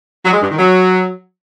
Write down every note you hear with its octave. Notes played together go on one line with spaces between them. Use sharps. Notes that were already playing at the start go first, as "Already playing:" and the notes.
F#3
G#3
G2
D#3
F#3